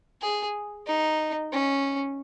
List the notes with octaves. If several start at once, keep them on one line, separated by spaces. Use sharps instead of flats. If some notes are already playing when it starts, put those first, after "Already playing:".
G#4
D#4
C#4